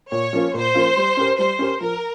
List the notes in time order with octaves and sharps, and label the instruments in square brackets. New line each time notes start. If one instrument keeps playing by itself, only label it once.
[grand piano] A#2 [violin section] C#5
[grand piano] F3 A#3 C#4 F4
[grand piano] A#2 [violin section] C5
[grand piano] F3 A#3 C#4 F4
G3
C#4 G4 A#4
[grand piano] G3 [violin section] C5
[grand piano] C#4 G4 A#4
[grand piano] F3 [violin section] A#4